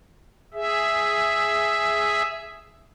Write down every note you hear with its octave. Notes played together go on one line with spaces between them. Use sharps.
G#4 E5